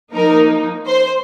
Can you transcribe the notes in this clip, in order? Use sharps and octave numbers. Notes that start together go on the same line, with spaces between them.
F3 A#3 D#4 A#4
C5